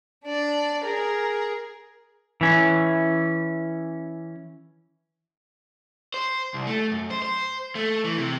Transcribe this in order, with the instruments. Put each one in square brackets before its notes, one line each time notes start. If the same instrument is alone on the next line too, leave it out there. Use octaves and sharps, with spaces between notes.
[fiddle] D4 D5
G#4 A#4
[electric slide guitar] E3 C#4
[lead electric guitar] C5
C2
A3
F#2
C5
C5
A3
E3
C3